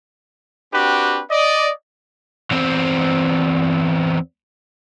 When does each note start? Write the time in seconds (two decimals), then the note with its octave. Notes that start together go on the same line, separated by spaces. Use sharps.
0.73 C4 D4 F#4 G4 B4
1.31 D5 D#5
2.52 E2 C4